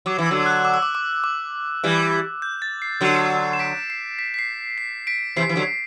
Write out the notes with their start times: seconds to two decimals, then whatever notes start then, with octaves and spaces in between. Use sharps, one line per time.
0.06 F#3 D6
0.19 E3
0.26 D3 F#3 E6
0.46 F#6
0.65 D6
0.74 E6
0.82 D6
0.95 D6
1.24 D6
1.84 E3 G3
2.42 G6
2.62 A6
2.82 C7
3.01 D3 F#3
3.53 E7
3.59 B6 D7
3.90 C7
4.19 B6
4.34 B6
4.39 C7
4.78 C7
5.07 B6 D7
5.36 C3 E3 C7
5.49 E3
5.56 D3 F#3